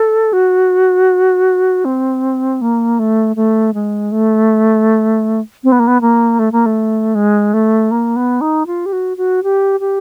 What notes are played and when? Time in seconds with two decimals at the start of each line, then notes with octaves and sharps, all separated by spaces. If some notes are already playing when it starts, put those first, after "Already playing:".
Already playing: A4
0.33 F#4
1.85 C4
2.61 A#3
2.99 A3
3.36 A3
3.74 G#3
4.12 A3
5.64 C4
5.72 B3
5.79 A#3
5.87 B3
6.01 A#3
6.39 A3
6.52 A#3
6.66 A3
7.15 G#3
7.54 A3
7.91 A#3
8.16 B3
8.41 D#4
8.67 F4
8.86 G4
8.93 F#4
9.17 F#4
9.43 G4
9.80 G4